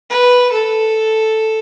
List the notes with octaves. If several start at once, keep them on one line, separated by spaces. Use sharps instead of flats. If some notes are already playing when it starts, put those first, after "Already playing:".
B4
A4